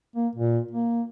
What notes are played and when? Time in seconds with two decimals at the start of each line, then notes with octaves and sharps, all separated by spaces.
0.16 A#3
0.35 A#2
0.71 A#3